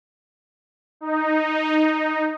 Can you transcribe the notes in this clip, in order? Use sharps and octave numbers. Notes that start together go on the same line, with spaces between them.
D#4